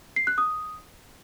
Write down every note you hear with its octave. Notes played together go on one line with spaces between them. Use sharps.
C7
F#6
D#6